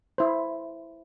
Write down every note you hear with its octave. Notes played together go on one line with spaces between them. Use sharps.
E4 C5